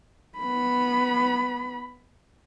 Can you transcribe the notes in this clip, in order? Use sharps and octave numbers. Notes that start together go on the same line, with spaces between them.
B3 B5